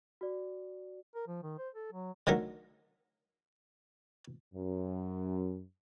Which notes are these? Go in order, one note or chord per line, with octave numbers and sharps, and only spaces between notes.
F#4 D5
A#4
F3
D#3
C5
A4
F#3
D3 D#3 F#3 A3 A#4
F#2